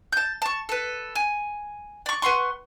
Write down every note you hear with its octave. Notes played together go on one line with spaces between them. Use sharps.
A5 G6
A5 C#6
A4 B4
G#5
D5 C#6
B4 F#5 C6 C#6